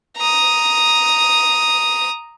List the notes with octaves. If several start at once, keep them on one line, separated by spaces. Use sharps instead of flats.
A#5 D#6